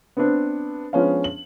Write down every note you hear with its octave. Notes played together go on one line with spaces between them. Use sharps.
B3 C4 D4
F3 G#3 B3 C#4 D4 F5
F#7